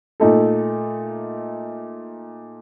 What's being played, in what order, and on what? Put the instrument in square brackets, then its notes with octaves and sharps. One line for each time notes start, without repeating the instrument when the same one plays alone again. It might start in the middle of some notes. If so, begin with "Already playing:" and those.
[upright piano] A#2 A3 D#4 A4